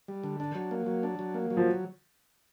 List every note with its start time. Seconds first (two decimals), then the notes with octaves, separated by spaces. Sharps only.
0.08 G3
0.24 D3
0.40 D4
0.55 F#3
0.71 A#3
0.86 F#3
1.03 D4
1.19 F#3
1.34 A#3
1.50 F#3
1.57 F3